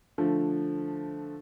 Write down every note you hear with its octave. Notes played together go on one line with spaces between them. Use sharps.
D3 F3 A3